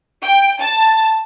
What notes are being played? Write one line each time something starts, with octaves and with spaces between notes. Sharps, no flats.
G5
A5